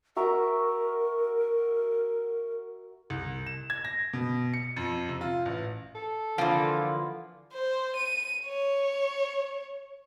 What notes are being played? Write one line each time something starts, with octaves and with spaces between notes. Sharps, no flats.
F#4 A#4 E5 A#5
C2
E7
G#6
A#6
B2
C#7
F2
C3
F4
A1
A4
D3 E3 F3 A#3 F4
C5
D#7
C#5